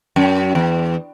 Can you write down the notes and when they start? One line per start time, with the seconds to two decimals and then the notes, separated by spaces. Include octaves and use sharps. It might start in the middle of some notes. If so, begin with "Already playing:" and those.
0.16 F#2
0.55 E2